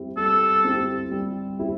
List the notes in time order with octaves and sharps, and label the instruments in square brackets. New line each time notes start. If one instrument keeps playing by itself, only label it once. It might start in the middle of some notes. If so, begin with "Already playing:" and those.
Already playing: [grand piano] G3 C4 E4 G4
[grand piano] G3 [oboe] A4
[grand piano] C4 E4 G4
G3
C4 E4 G4